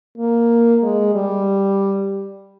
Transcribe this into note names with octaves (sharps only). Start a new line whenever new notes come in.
A#3
G#3
G3